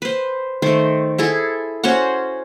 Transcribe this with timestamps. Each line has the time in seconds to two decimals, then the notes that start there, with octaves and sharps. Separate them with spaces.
0.02 B4 C5
0.62 D#3 A3 C5
1.18 E4 G#4 A4
1.84 C#4 F#4 C5 F#5